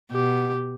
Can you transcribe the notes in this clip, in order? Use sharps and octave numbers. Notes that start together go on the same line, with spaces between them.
B2 G4